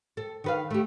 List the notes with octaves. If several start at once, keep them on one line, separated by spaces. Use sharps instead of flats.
A4
D#3 B4 F5
A3 G4